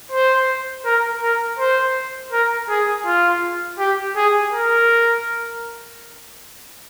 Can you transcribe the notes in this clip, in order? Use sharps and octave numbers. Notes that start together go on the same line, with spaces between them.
C5
A#4
A#4
C5
A#4
G#4
F4
G4
G#4
A#4